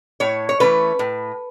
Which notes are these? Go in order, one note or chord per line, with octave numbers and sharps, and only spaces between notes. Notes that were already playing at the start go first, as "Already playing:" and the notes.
A2 C#5
C#5
E3 A3 C#4 B4
A2